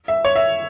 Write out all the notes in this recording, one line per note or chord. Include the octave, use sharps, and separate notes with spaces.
E5
C#5
E5